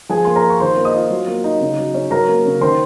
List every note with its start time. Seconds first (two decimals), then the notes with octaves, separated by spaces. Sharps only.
0.09 F3 G#4 G#5
0.25 A#3 C6
0.36 A#4 A#5
0.43 F4
0.50 C#6
0.60 D#3 C5 C6
0.76 A#3
0.85 D#5 D#6
0.94 F4
1.10 F#3
1.27 A#3
1.44 D#4
1.60 C#3
1.78 F#3
1.94 C#4
2.11 F#3 A#4 A#5
2.28 A#3
2.45 C#3
2.61 D#3 C5 C6